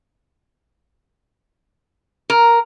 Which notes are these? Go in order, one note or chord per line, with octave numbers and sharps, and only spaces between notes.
A#4